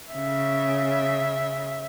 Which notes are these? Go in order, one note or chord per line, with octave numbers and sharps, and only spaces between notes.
C#3 E5